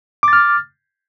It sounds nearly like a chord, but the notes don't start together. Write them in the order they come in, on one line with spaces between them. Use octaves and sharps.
D6 A6 F6